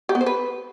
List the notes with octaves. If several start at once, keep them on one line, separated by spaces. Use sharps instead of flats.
G4
B3
C5
B4